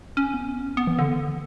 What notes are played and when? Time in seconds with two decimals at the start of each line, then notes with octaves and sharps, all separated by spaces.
0.17 C#4
0.34 B3
0.66 C#4
0.77 B3
0.87 E3
0.99 D3